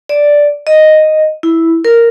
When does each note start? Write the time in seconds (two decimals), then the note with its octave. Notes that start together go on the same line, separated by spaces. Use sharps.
0.09 D5
0.67 D#5
1.43 E4
1.85 A#4